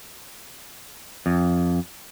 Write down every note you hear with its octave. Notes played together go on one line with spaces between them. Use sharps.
F2